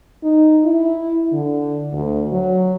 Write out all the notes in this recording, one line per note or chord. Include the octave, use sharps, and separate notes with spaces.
D#4
E4
D3
D2
F#3